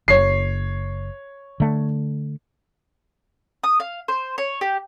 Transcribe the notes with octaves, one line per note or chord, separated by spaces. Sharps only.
F#1 C#5 C7
D3 A3
D#6
F5
C5
C#5
G4